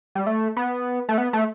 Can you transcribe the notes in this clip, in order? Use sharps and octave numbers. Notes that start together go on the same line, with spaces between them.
G3
A3
B3
A3
B3
A3